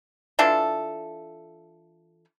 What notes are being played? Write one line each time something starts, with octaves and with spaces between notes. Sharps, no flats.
E3 D4 F4 A4